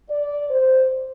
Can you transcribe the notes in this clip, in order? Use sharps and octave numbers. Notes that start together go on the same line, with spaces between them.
D5
C5